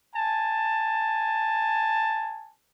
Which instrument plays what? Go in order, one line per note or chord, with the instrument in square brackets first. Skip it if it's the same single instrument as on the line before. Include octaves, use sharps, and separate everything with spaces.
[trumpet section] G#5 A5